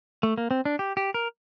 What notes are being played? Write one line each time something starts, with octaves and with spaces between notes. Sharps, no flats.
A3
A#3
C4
D4
G4
G4
A#4